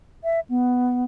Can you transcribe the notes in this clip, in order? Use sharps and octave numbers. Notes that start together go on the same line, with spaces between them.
E5
B3